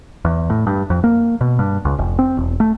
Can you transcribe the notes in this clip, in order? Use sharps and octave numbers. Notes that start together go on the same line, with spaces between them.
E2
A2
G2
F2
A#3
B2
G2
C#2
F1
C4
E1
A3